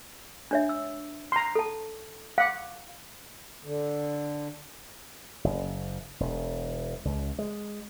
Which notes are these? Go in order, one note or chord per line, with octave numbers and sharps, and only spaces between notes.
D4 C#5 E5
E6
A#5 C6
A4 A5
F5 F#5 D6
D3
F#1
E1
C#2
G#3